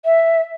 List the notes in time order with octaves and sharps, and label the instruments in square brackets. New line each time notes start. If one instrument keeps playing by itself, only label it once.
[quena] E5